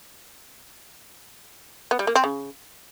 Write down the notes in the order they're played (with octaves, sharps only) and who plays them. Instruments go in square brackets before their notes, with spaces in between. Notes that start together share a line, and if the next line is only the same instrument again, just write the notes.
[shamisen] B3
G3
A#3
C4
C#3